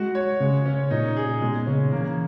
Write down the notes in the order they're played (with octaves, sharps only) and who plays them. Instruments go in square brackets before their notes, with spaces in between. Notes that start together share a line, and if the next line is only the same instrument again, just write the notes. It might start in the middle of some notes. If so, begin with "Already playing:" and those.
Already playing: [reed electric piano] G#3 [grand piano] F#4
[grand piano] C#5
[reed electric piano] C#3 [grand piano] G#3
[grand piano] C#4
[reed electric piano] A#2 [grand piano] D#4
[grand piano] G#4
[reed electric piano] B2 [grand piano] G#3
[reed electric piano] C#3 [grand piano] C#4
[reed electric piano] E3 [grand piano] A#3